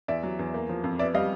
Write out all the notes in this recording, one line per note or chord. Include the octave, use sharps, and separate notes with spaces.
E2 D5 E5
F#3
E2
A#3
F3
F2
B3 D5 E5
G3 D#5 F5